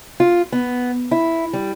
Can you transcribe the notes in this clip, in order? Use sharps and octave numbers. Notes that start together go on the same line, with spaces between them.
F4
B3
E4
G3